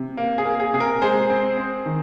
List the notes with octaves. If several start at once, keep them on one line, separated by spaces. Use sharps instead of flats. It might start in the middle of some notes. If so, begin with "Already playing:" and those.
Already playing: C3
A#3
G#4
A#3
G#4
C3 G#4
A#4
G#3 G#4 C5
C4
C4
D#3